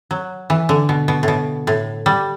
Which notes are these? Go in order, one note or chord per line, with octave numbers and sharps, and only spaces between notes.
F#3
E3
D3
B2
B2
A2
B2
A2
G3